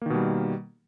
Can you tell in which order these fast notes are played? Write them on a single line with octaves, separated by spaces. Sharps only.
A#3 D#3 B2 G3